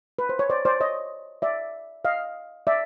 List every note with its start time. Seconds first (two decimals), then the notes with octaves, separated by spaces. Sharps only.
0.19 B4
0.29 C5
0.39 C#5
0.50 C5 D5
0.65 C5 D5
0.80 C#5 D#5
1.42 D5 E5
2.05 D#5 F5
2.67 D5 E5